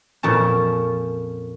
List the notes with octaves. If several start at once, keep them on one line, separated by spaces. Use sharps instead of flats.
F2 A#2 C#4 A5